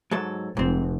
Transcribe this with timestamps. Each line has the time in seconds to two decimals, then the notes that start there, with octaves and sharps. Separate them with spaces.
0.11 G#2 F#3 A4
0.57 F1 G#2 C4